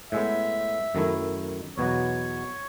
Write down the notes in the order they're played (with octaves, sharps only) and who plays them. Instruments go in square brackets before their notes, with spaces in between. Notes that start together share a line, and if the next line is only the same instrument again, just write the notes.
[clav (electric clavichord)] A2 G#3 B3 [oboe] E5
[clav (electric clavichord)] F#2 D#3 A3 E4
[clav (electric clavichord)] E2 B2 F#3 B3 F#4 [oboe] C#5